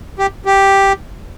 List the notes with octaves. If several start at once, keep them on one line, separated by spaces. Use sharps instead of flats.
G4
G4